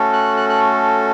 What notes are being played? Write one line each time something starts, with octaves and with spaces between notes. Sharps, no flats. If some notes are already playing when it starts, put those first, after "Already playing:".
Already playing: A3 C#4 F#4 A4
F#6
F#6
F#6